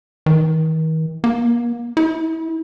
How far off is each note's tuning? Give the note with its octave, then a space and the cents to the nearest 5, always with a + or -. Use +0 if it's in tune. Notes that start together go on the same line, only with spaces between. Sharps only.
D#3 +40
A#3 +35
E4 -30